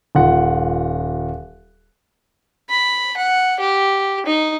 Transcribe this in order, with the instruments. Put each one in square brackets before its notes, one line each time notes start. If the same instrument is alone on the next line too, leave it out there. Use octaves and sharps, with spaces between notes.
[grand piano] D#1 F4 F#5
[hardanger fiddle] B5
F#5
G4
D#4